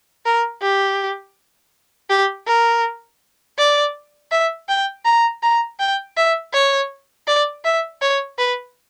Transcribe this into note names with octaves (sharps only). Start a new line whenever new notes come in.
A#4
G4
G4
A#4
D5
E5
G5
A#5
A#5
G5
E5
C#5
D5
E5
C#5
B4